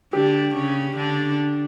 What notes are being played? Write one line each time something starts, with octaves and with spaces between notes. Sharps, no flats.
D3 D4 G4
C#3 C#4
D3 D4